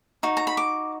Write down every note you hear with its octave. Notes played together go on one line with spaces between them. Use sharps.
D#4 F#4
A#5
B5
D6